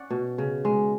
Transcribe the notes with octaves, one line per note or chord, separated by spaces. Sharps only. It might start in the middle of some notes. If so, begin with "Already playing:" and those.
Already playing: C#4 D5 F#5
B2
C#3
G#3